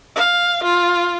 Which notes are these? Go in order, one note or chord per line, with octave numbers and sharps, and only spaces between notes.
F5
F4